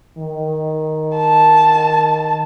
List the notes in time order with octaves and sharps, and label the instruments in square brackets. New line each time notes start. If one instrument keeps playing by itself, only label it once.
[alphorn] D#3
[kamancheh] A5